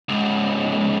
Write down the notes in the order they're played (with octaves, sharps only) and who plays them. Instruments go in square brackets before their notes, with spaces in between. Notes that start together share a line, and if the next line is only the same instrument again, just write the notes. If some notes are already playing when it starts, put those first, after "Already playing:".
[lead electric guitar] C#2 G#2